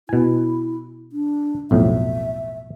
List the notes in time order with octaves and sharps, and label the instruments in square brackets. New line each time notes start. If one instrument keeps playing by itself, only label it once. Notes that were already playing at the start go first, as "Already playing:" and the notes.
[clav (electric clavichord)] B2 G#5 [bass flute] E4
[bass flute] D4
[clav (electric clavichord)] B1 F2 A2 [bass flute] E5